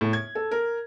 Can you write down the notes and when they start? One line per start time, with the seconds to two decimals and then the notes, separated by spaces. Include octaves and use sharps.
0.01 A2
0.13 G#6
0.35 A4
0.51 A#4